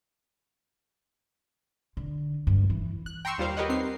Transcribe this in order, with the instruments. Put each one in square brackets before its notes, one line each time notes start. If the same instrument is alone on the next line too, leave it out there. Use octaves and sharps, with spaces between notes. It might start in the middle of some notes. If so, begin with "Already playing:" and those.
[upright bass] D3
G2
E3
[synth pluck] F#6
G5 A#5 C6 C#6 E6 C#7
D#2 G3 F4 C5 F5
G4 A#4 B4 C#5 D#5 F#5
C4 D#4 C7